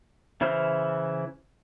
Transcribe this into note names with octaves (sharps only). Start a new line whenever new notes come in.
C#3 E3 E4 C5 F6